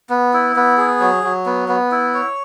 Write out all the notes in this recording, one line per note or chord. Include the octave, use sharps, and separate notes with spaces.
B3
E4
B3
G#4
F#3
F#3
B3
B3
E4
C#5